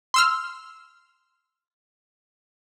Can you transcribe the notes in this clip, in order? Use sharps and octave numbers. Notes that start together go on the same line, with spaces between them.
C6 E6 F6